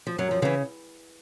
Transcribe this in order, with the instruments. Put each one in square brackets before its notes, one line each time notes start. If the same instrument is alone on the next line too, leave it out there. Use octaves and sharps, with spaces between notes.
[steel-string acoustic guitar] F3
F#2 F#3
F3
C#3 F3
E3